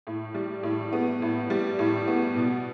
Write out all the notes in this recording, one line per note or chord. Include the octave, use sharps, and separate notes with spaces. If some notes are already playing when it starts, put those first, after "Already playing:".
A2
G3
A2
B3
A2
G3
A2
B3
B2